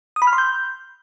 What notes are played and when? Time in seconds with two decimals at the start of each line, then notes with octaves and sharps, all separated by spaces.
0.16 D#6
0.22 B5
0.27 F6
0.33 C6
0.38 G6